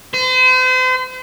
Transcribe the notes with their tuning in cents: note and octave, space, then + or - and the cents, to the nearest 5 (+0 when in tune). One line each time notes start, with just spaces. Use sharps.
C5 -40